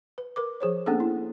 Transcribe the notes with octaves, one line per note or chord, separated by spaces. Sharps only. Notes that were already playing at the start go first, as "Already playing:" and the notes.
B4
A#4 B4 D6
F3 G#4 C5 C#5
A#3 B3 C#4 D4 G#4 A4
E4